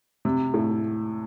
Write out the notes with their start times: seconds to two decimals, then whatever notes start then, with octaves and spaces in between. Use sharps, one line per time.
0.25 C3
0.54 A2